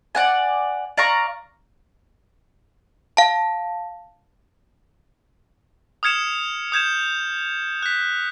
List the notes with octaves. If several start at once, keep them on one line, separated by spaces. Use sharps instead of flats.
D5 F#5 G#5
D5 F5 A#5 C#6
F5 A5
D#6 F6 G#6 C#7 E7
D#6 G6 G#6 E7
F#6 B6